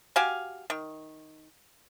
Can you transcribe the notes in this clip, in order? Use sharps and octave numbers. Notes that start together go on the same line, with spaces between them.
F#4 G4 F5 G#5
D#3